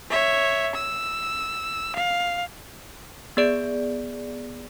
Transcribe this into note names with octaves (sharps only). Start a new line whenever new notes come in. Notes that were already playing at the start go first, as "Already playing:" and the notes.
C#5 E5
E6
F5
B3 G#4 D5 D7